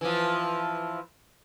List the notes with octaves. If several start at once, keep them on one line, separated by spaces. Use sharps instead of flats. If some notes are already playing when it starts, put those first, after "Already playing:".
E3 F3